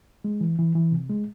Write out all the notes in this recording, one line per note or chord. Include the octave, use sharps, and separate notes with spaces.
G#3
E3
E3
E3
C3
G#3